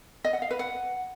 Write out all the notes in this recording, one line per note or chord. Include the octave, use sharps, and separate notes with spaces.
D#5
F#5
F5
B4
F#5